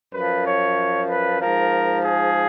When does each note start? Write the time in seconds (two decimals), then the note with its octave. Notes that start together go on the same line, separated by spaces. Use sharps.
0.12 F#2 F3 B4
0.44 C#5
1.08 B4
1.40 G#2 F3 A#4
2.04 G#4